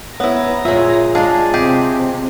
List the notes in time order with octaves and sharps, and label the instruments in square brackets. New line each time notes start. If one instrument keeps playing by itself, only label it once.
[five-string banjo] B3 E4 [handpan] C#5 [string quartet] A#5
[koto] A#2 G#3 [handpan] F4 C#5 [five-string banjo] E5
[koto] G#3 G#4 [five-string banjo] D4 [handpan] D#5 F5
[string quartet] C3 [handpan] C4 D#5 [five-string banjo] G4 [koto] G#4